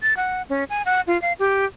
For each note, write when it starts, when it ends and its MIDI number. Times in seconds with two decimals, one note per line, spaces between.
0.02 0.14 93
0.17 0.42 78
0.50 0.64 61
0.70 0.83 80
0.86 1.01 78
1.07 1.20 65
1.22 1.33 77
1.39 1.65 67